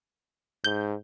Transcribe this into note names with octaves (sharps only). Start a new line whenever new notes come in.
G#2 G6